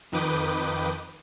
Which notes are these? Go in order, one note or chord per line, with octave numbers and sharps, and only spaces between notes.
F2 D#3 B4 D6 D#6 G6